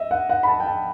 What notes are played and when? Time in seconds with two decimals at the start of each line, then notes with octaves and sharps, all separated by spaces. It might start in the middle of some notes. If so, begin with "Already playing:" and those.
Already playing: D#5 E5
0.11 F#5
0.30 F#5
0.43 B5
0.48 A5
0.60 G5
0.66 A5